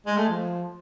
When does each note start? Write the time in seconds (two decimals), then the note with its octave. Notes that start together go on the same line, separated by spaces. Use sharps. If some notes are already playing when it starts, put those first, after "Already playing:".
0.06 G#3
0.17 A3
0.29 F3